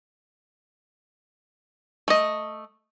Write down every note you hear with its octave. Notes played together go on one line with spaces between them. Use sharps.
A3 D#5